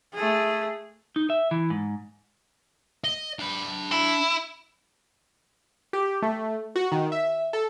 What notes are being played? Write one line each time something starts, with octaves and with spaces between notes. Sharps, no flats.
A3 G#4
D#4
E5
E3
G#2
D#5
D4 B5
E4
G4
A3
F#4
D#3
E5
A4